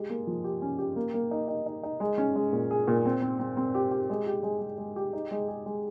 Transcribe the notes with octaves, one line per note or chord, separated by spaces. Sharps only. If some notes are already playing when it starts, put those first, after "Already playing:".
Already playing: G#3 G4
A#3
F3
G4
C#4
G4
A#3
A#3
D#4
D#4
D#4
D#4
G#3
C#4
G#3
A#2
G#4
A#2
C4
C4
C4
C4
G4
G4
G#3
G4
G#3
G#3
G#3
G4
D#4
G#3
G#4
G#3